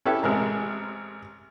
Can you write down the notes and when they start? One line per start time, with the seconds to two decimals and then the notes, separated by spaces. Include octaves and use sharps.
0.06 C#4 E4 G4 A4 B4
0.23 A1 C3 G#3 A#4